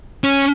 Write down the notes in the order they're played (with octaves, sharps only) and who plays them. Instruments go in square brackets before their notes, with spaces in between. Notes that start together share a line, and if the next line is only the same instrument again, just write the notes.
[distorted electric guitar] C#4